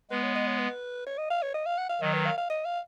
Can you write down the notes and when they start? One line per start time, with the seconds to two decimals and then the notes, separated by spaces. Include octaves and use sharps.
0.11 G#3 B3 B4
0.23 C#5
0.35 D#5
0.47 C#5
0.59 B4
1.06 C#5
1.18 D#5
1.30 F5
1.42 C#5
1.54 D#5
1.66 F5
1.78 F#5
1.89 F5
2.01 D#3 F#3 D#5
2.14 B4
2.26 F5
2.37 F5
2.50 D#5
2.65 F5